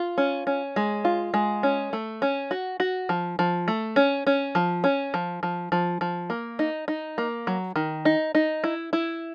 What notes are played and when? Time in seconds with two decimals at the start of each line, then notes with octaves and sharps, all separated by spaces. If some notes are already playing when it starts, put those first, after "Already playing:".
Already playing: F4
0.18 C#4
0.47 C#4
0.76 G#3
1.05 F4
1.34 G#3
1.63 C#4
1.93 A3
2.22 C#4
2.51 F#4
2.80 F#4
3.09 F3
3.39 F3
3.68 A3
3.96 C#4
4.27 C#4
4.55 F3
4.84 C#4
5.14 F3
5.43 F3
5.72 F3
6.01 F3
6.30 A#3
6.59 D#4
6.88 D#4
7.18 A#3
7.47 F#3
7.76 D#3
8.05 D#4
8.35 D#4
8.64 E4
8.93 E4